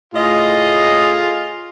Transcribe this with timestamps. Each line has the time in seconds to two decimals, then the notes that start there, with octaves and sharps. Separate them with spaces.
0.14 A2 F4 G#4 D#5